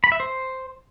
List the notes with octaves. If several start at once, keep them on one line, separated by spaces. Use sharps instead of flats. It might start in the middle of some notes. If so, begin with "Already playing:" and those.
B5
E5
C5